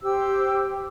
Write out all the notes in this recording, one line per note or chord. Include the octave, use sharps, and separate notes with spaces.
G4 C5 E6